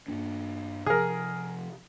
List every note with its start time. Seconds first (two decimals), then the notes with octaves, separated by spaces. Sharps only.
0.08 G2 A#3 D4
0.86 C3 F3 G#4 A#4